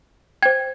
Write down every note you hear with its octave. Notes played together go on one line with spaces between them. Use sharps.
C5 G5 G#6